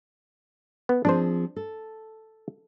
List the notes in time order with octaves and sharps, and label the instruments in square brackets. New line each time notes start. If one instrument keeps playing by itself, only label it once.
[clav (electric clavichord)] B3
[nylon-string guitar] F3 C4 G#4 [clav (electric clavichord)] D4 C5
[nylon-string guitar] A4